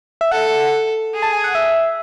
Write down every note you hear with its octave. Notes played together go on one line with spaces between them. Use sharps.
E5
A4 F#5
G#4
A5
G#5
F#5
E5